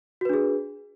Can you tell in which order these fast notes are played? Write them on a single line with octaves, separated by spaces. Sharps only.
F#4 B4 D4 G#4